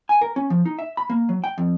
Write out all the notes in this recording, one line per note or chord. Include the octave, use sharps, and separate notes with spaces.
G#5
A#4
C#4
F3
D#4
E5
B5
A#3
F#3
G5
F2